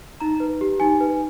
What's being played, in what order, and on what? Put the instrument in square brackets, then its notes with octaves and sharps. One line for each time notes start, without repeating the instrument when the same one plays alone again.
[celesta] D#4 A#5
B4
G4
D#4 G#5
B4